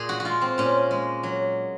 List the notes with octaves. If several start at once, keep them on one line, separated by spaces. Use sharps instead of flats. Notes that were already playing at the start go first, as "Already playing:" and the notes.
Already playing: A#2 G#4
F#4
F#4
G#3 F4
C4
A#2 C#4
G#3
F#3